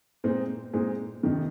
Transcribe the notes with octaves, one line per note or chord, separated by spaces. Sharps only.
A#2 G#3 C4 D#4
A#2 G#3 C4 D#4
F2 C3 D#3